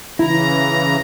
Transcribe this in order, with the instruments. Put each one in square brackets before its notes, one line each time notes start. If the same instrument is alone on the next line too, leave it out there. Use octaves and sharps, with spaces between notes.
[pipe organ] C#3 E3 A#5 [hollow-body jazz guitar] E4